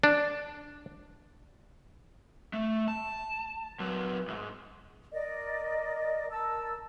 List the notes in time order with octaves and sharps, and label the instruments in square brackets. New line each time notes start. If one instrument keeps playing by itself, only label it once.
[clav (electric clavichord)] D4
[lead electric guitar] A3
A5
A#2 F#3
B1 G#2
[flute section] A#4 D5 D#5
A#4 A5 E6